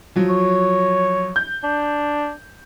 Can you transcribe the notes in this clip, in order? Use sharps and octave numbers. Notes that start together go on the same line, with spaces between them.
F3 F#3
C#5
G6
D4